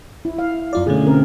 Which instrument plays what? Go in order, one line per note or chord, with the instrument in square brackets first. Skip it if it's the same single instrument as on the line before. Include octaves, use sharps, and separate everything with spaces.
[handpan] E4
F5
[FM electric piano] F#2 F4 D5
[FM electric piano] B2 D3 C#4 [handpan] A3 G#4
[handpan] C4 A#4